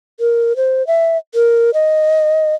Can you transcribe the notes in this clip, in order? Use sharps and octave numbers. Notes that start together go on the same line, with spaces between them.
A#4
C5
E5
A#4
D#5